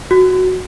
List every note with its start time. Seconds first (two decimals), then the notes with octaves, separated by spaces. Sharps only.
0.11 F#4